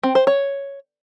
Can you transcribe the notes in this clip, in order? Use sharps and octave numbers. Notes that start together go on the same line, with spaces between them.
C4
C5
C#5